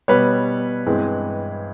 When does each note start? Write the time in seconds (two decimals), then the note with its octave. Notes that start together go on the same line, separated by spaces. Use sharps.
0.08 B2 G3 B3 B4 C#5
0.86 G2 E3 G#3 C4